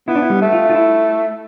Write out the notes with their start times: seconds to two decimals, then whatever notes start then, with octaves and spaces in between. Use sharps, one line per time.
0.08 B3 E4
0.15 D4
0.22 E4
0.30 G3
0.42 A3
0.53 F4
0.70 F4
0.75 E4